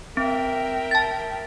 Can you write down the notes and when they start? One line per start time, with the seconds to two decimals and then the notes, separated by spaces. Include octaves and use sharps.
0.17 C4 A#4 E5 G5
0.91 A5 A6